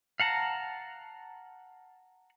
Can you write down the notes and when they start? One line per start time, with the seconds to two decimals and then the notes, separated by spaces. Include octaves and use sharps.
0.20 F5 F#5 A5 A#5